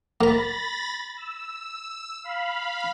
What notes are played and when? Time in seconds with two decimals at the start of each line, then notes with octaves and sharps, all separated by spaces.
0.21 A#3 A#5 B5 A6 A#6
1.17 E6
2.24 F5 B5